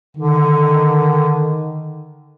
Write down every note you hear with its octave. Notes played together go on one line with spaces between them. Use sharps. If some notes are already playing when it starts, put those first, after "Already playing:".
D3 D#3